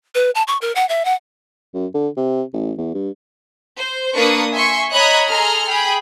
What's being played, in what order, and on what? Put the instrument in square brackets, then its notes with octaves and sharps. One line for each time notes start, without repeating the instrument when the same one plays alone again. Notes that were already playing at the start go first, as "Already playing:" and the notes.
[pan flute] B4
A5
C#6
A#4
F#5
E5
F#5
[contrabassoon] F#2
D3
C3
A1
E2
G2
[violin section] C5
A#3 D4 B4 C#6 D#6
E5 G#5 C6 C#6
C#5 D#5 A#5 B5 F#6 G#6
G#4 A4 A#5 C6 F6
G#4 G5 B5